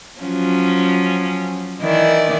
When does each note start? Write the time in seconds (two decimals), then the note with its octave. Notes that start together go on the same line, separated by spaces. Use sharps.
0.20 F3 F#3 C#4
1.81 D#3 E3 D5